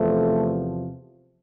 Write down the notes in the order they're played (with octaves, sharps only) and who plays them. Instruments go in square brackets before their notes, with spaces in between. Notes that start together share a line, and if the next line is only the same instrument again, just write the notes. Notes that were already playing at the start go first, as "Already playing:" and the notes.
Already playing: [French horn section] E2 C3 F3 A3